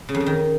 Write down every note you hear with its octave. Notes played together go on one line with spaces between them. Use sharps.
C#3
F2
C#3
D#3